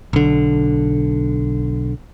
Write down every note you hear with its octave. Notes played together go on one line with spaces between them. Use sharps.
B1 D3